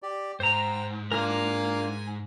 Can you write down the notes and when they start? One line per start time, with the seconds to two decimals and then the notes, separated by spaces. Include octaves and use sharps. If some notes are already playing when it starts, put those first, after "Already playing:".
0.02 G4 D5
0.40 G#2 C5 G5 A#5
1.12 A#3 D4 F4 A#4 G#5